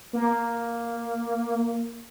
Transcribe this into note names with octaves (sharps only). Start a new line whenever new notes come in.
A#3